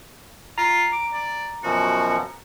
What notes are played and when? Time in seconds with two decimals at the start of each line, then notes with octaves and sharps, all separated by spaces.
0.58 F4 A#5
0.93 D6
1.13 D5
1.64 F#2 B2 F3 F#4